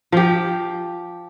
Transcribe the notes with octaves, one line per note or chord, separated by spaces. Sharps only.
F3 G4